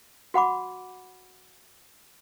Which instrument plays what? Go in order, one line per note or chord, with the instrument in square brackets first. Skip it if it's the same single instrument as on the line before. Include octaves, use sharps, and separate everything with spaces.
[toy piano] F#4 F#5 B5 D6